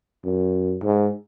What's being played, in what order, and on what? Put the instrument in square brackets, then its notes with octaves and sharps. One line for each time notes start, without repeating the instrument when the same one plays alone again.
[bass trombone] F#2
G#2